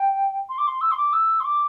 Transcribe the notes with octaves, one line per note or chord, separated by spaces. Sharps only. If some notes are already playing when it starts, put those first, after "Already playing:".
Already playing: G5
C6
D6
C6
E6
C6
D6
E6
C6
D6